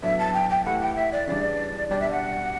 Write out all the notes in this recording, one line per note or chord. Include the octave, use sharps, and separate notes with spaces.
A2 F#3 B3 D4 E5
A5
G5
G5
E3 A3 E4 G4 F#5
G5
E5
D5
C#3 E3 G3 D4 D5
B2 G3 D4 G4 D5
E5
F#5